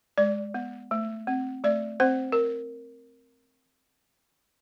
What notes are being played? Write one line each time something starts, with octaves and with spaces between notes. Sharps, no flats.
G#3 D5
B3
A3
C4
A3 D5
C4 C5
A#4